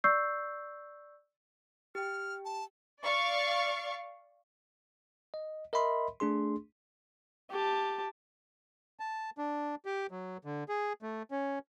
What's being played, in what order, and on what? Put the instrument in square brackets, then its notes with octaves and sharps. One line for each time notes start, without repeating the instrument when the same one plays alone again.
[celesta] D5 C#6 E6 G6 C7
[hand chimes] G4 G5 [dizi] F6
[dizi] A5
[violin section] D5 F5 C#6
[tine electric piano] D#5
A#4 D#5 E5 B5 C6
A3 D4 G#4 C6
[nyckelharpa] G4 A5
[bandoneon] A5
D4
G4
F#3
D3
G#4
A3
C#4